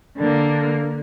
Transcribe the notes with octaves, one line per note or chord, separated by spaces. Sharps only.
D3 A#3